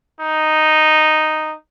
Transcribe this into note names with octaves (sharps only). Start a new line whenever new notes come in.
D#4